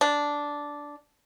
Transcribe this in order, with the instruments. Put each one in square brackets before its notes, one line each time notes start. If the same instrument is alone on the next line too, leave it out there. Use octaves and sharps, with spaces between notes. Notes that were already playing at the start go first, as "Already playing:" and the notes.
[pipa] D4